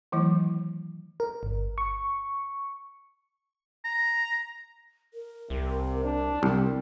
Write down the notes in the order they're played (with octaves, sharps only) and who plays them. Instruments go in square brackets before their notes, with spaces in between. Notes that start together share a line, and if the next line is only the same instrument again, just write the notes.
[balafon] D#3 E3 F#3 A3 E4
[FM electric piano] A#4
G1
C#6
[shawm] A#5
[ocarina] A#4
[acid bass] C2 [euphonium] C3
[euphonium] D4
[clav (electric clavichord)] C2 [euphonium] G3